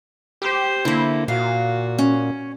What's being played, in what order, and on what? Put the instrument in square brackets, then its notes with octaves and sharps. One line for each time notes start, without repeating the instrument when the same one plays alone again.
[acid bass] G4 [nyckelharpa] C5
[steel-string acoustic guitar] D3 A#3 [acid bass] E4
[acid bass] A#2 [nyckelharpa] F#4 [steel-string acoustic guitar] F5
[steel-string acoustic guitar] C#4